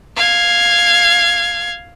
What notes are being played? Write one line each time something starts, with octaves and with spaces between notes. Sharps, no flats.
F5 G#6